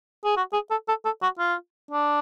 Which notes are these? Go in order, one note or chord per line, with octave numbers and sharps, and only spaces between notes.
G#4
F#4
G#4
A4
A4
A4
F#4
F4
D4